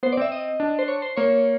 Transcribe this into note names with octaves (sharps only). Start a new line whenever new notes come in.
B3 C5
D5
C4 E5
D#5
D4
C5
C#5
C5
A#3 C#5